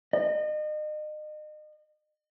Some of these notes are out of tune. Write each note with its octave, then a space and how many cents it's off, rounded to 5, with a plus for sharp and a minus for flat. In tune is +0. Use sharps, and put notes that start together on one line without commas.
D#5 -35